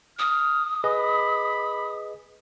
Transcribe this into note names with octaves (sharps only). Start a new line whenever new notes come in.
D#6 F6
G#4 B4 D#5 B5